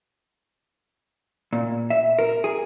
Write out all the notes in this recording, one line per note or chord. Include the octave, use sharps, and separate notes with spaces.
A#2
E5
A#4
G#4